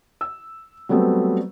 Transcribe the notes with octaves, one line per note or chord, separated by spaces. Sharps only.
E6
F#3 G3 A3 B3 C4